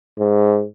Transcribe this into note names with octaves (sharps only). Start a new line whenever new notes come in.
G#2